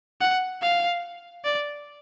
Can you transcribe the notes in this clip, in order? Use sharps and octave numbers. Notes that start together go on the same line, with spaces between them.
F#5
F5
D5